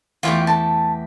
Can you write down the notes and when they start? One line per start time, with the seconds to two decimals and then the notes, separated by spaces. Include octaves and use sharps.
0.23 E2 A3 F4 G4 C#5 G5
0.47 A5